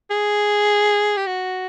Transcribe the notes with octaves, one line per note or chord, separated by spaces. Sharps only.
G#4
G4
F#4